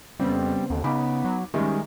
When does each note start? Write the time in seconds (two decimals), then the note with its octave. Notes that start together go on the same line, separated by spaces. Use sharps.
0.20 F2 C#3 G3 B3 C4
0.70 D#2 D3
0.84 C#3 B3 D#4 B5 D6
1.25 F#3
1.54 D#3 G3 G#3 C#4 E5